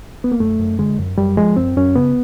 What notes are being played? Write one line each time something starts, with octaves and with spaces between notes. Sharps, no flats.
B3
A#3
F#2 A3
F#2
D3 G#3
F#2
F#2 G3
F3 G#3
F#2 C4
F#2 C#4
C#3 B3